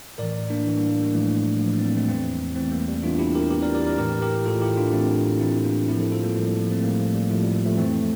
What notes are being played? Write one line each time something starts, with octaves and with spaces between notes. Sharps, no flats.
A2 E3 A#4 D5
A#3 D4
A2 E3
G3 A#3
G3 A#3
A2 E3 F3 A3
A2 E3 F3
G3
C4
G3 A#3
A3 C4
E2 E3 C4 E4
E2 E3 A3 C4
G3 A#3
G3
E2 E3 D4 F4
E4 G4
G4 A#4
E2 E3 G4 A#4
A#4 D5
A#4 D5
A#4 D5
A2 E3 G4 A#4
G4 A#4
A2 E3 F4 A4
E4 G4
D4 F4
A2 E3 C4 E4
A2 E3 C4 E4
A#3 D4
A2 F3 C4 E4
A4 C5
F4 A4
G3 A#3
A2 F3 G3 A#3
G3
F3
A3 C4
A2 F3 G3 A#3
F3 A3
G3
A2 F3 A3
G3
F3 A3
F2 E3 A3 C4